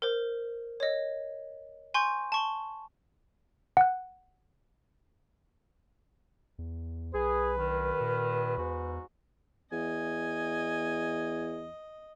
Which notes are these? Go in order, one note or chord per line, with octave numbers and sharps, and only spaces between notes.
A#4 C5
C#5 D#5
G#5 C6 C#6 G6
A5 C#6 G7
F#5 F#6
E2
B1 G#4 B4
G2 D#3
A#2
E2 G#2 F#4
E2 D#5 G#5